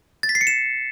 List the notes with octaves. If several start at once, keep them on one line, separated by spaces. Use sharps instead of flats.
A6
B6
C7
C#7
E7